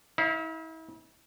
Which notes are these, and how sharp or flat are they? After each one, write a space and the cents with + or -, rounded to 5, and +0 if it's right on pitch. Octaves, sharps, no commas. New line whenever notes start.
E4 -40 F5 +0